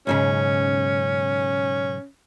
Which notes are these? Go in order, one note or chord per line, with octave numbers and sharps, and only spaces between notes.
B1 G#2 C#3 C#4